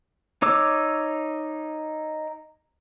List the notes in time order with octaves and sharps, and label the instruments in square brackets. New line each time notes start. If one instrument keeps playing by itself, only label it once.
[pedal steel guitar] D#4 C#5 D6 E6